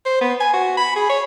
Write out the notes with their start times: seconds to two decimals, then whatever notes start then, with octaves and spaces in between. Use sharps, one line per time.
0.06 C5
0.21 B3
0.40 G#5
0.54 F#4
0.77 B5
0.96 G#4
1.10 C#5